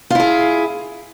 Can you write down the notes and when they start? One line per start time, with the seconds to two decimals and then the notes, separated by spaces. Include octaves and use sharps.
0.10 F4
0.15 E4
0.20 G#4